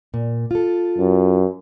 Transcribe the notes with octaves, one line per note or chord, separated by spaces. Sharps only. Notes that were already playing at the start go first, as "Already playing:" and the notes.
A#2
F4 A4
F#2